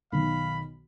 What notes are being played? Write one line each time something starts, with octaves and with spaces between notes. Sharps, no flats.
B1 D#3 F5 B5